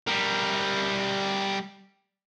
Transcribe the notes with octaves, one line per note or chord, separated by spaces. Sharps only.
G3 A#4